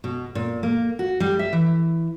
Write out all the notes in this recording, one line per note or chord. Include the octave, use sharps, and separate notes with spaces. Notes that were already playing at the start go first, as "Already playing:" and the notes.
B2
A#2
A#3
F#4
G3
E5
E3